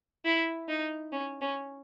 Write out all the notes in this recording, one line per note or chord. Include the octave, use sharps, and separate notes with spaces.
E4
D#4
C#4
C#4